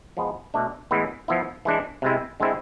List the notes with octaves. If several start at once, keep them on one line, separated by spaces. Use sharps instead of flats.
F3 G#3 B3
B2 A3 D4
A2 E3 G#3 B3 E4
F3 B3 E4
E3 G#3 D4
C3 G#3 C4 E4
D3 G#3 C4 E4